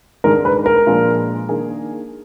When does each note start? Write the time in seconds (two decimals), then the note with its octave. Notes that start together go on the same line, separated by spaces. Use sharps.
0.24 G#2 D#3 G#3 D4 A#4
0.45 B4
0.66 A#4
0.86 A#2 F3 G#3 D4 F4
1.49 D#3 A#3 D4 G#4